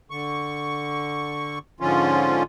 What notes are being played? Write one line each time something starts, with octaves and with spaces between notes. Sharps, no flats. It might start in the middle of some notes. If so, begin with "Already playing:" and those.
D3 C#6
G#2 D3 F3 C#4 F4